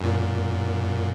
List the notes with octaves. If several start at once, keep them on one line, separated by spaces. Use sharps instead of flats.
F#2 A#2